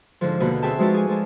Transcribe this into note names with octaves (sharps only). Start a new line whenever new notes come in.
G#2 D3 F3
D#2 B2 D3 A#3 F#5 B5
C4 F#4 G#4 E5 G5 A5
F3 G#3 D#4 F#4 B4 D5
G#4 A4 G#5
F3 G#3 A5